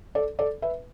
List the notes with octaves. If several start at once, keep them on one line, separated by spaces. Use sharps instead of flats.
A4 D5
A4 D5
B4 E5